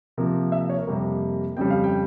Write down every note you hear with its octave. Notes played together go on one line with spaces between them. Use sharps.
C3 F3 A#3
E5
C#5
A#4
F2 C3 G3 A#3
F2 C#3 G3 G5
F5
G5